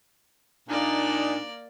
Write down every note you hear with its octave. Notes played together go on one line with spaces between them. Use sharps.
A#2 A#3 D4 D#4 D5